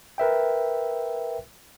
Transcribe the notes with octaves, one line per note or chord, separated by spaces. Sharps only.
A#4 B4 E5 G5